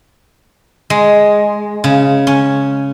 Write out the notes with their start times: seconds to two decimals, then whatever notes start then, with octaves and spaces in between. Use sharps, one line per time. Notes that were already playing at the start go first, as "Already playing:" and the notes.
0.90 G#3
1.84 C#3
2.27 C#4